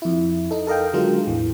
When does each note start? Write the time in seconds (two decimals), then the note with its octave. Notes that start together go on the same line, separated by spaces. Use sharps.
0.02 F2 E4
0.51 D#4 A4
0.67 A4 A#4 D#5 F5 G5
0.93 D3 F#3 G#3 F4 A#4
1.27 A1 E2 E3